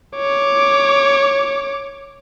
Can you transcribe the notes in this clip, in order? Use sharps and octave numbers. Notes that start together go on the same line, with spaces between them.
C#5 D6